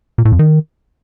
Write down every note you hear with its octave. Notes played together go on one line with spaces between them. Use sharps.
A#2
A2
F2
D#3